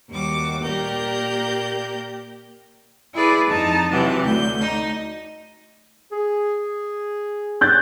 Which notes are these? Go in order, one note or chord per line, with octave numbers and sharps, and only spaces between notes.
D#2 G3 F#4 D6
A#2 A#3 G4 A#4 D5 G6
E4 G#4 B4 D5
F2 D#4 A5
C3 E3 F#3 G4
D2 G6
D#4
G#4
F#6 G6 A6